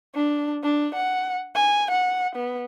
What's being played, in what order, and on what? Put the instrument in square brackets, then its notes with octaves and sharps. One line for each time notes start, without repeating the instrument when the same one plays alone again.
[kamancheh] D4
D4
F#5
G#5
F#5
B3